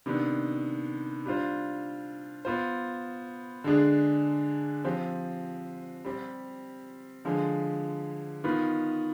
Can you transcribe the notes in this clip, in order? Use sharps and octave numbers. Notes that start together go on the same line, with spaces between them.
C3 D#3 B3 D4
G3 D4 F4 C5
B3 F4 C5
D3 G#3 D4 G#4
F3 C4 G4
G3 C4 G4
D3 F3 G#3
D#3 B3 F4 B4